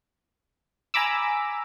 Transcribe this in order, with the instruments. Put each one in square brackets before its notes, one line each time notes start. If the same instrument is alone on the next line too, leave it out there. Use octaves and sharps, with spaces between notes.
[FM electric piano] G#5 A#5 B5 D6 E6